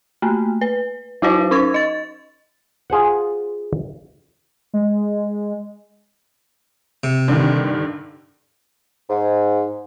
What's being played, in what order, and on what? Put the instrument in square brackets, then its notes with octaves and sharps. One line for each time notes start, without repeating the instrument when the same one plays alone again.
[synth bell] A3 A#3
B4
F#3 E4 F#4 B4 C5 F5
C#4 D#4 C#6 G#6
D#5 A6
[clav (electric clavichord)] F4 G#4 C5 F#5
[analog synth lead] G#3
[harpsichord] C3
[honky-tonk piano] G2 D3 D#3
[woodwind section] G#2